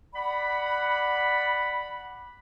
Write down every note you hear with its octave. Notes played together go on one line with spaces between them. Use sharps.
D5 F#5 B5